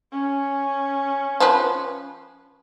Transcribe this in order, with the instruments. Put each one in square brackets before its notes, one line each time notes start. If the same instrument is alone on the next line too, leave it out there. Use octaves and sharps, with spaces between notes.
[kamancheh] C#4
[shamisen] F3 B4